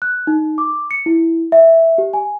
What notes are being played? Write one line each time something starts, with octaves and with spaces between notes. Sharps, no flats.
F#6
D#4
D6
C#7
E4
E5
G4
G#5